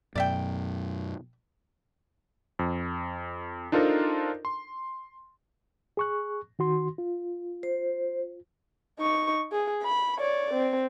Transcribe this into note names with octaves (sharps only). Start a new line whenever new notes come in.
F#2 B2 D5 E5 G5
F2
D4 D#4 F4 A4 A#4 C5
C6
G#4 C#6 F#6
D#3 F#4 C6
F4
C5
D#4 C#6
G#4
B5
C#5 D5
C4